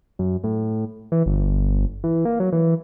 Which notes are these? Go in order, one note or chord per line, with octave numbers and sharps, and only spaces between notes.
F#2
A2
E3
G1
E3
A#3
F#3
E3